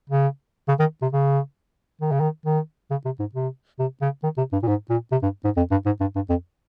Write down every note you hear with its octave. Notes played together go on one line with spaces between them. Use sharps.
C#3
C#3
D#3
C3
C#3
D#3
C#3
D#3
D#3
C#3
C3
G#2
C3
C3
C#3
D#3
C3
G2
A#2
G#2
A#2
C3
G2
G#2
F2
G2
G#2
G2
G2
F2